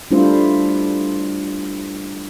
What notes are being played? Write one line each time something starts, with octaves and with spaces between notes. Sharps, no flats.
G3 A3 D4 E4 F4 C5